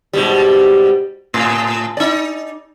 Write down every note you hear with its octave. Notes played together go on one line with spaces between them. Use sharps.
G#2 B2 G3
A2
D#4 D5